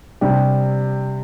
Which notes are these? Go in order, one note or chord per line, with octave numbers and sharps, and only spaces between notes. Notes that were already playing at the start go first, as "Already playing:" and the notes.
C3 G3 D4 G4